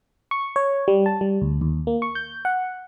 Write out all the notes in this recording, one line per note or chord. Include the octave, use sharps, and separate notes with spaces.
C#6
C#5
G3
A5
G3
D2
D#2
A#3
C#6
G6
F#5